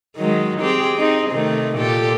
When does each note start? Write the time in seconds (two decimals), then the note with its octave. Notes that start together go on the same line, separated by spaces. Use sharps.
0.17 D#3 F#3 G#3
0.60 C4 G4 G#4
0.97 C4 D#4 G#4
1.31 C3 D#3 A3
1.76 A#2 G4 A4